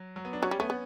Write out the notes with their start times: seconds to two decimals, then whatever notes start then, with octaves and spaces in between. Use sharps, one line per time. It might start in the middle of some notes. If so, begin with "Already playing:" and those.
Already playing: F#3
0.16 F#3
0.25 B3
0.33 D4
0.42 F#3 C#4
0.51 G3
0.60 A3 B3
0.70 B3